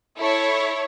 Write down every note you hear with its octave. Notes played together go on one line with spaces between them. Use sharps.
E4 A4 C#5